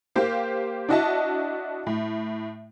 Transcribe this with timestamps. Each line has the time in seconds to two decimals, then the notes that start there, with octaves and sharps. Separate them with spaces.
0.16 A#3 G4 C5 F5
0.89 D4 E4 F#4 D#5 E5 A5
1.87 A2